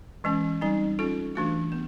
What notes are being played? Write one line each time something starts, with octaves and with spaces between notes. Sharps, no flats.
E3 G#3 C#4
G3 C4 D#4
C#4 F4 A4
E3 A3 D4 F#4
B3